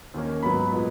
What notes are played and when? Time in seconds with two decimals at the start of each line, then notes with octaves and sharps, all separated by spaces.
0.14 D#2 D#3 A#3 C#4
0.42 G#2 F#3 B3 B5
0.71 A#2 G#3 B3